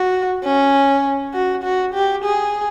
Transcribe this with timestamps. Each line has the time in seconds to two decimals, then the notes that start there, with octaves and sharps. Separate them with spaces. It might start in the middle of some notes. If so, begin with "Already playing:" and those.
Already playing: F#4
0.43 C#4
1.34 F#4
1.64 F#4
1.94 G4
2.24 G#4